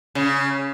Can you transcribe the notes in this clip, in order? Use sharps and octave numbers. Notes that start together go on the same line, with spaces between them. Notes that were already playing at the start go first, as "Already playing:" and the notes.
C#3